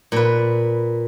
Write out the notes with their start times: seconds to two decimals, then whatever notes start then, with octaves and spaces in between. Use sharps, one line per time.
0.12 A#2 B4